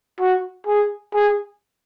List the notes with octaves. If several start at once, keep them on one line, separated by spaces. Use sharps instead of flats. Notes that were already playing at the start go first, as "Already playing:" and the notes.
F#4
G#4
G#4